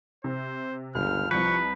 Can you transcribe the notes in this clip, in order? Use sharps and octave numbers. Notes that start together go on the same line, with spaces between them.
C3 C5
G1 C#2 F6
C2 F3 B4 C#6 G6 C#7